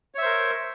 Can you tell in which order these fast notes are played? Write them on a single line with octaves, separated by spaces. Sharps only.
C#5 E5 C5 A#4